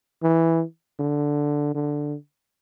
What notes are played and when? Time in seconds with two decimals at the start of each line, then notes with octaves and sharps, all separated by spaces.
0.23 E3
0.99 D3
1.75 D3